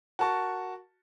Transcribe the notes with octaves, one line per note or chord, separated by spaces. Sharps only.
F#4 A#4 A5 C#6